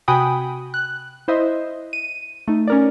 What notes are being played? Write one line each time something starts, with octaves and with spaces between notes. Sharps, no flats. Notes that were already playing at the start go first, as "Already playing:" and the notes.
C3 F#4 G5 G#5 B5 D#6
F#6
E4 C5 D#5 E5
D#7
A3 D#4
C#4 A#4 D5